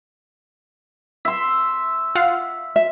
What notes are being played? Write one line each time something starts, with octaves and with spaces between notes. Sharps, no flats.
E5 C6
F4 F5 F#5
E5